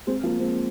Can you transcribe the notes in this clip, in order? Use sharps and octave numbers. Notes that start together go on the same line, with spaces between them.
G#3 C4
F3 A#3
G#3 C4